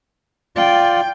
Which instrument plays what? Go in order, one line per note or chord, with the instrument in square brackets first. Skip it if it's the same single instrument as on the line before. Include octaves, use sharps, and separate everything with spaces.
[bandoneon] F4 D5 [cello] G5